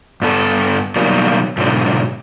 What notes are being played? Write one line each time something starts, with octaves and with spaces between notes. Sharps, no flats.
G2 B3 A4
B2 D#3 F#3 G3 A#3
G#2 B2 D3 F#3